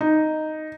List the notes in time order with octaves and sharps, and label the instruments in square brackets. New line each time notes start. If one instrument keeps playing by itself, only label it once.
[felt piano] D#4